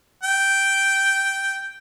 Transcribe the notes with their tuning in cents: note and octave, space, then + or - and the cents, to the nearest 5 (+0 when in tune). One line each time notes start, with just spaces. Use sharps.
G5 -5